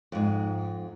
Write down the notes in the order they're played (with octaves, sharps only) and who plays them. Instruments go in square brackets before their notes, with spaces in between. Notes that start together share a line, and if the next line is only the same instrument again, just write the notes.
[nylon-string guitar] F2 G#2